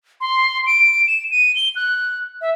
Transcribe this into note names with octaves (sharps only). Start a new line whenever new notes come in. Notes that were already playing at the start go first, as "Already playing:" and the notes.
C6
D7
E7
D#7
G7
F#6
E5